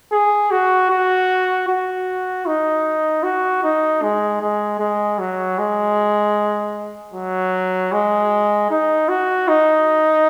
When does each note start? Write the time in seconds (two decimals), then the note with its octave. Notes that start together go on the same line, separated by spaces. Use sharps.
0.12 G#4
0.51 F#4
0.90 F#4
1.68 F#4
2.46 D#4
3.24 F#4
3.64 D#4
4.02 G#3
4.41 G#3
4.79 G#3
5.19 F#3
5.58 G#3
7.14 F#3
7.92 G#3
8.70 D#4
9.09 F#4
9.48 D#4